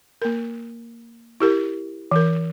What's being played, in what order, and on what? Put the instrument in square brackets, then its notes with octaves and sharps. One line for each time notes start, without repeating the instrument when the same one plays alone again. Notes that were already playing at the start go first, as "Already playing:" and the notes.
[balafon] A#3 A#4
E4 G4 A#4
E3 A#4